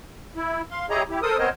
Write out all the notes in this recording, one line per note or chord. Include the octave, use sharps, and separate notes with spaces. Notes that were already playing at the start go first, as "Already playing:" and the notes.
E4
F5 C6
E4 G4 G#4 C#5 D#5 A#5
E4 G4
A4 A#4 C5 D#6
B3 C4 A#4 C5 C#5 D#5